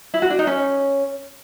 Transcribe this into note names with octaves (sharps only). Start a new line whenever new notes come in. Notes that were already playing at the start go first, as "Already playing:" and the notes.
E4
F#4
D4
D#4
C#4